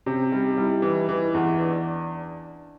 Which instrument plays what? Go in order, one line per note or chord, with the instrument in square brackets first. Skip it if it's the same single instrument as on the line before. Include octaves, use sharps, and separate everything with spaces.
[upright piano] C3 [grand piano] C#4
[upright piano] G3 [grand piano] D#4
[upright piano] G3 [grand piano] E4
[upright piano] E3 [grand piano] E4
[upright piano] E3
[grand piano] E4
[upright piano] E2
[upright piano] E2 [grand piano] D4